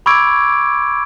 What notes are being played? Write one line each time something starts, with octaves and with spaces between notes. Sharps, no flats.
B5 C#6 D6 E6 G#6 D7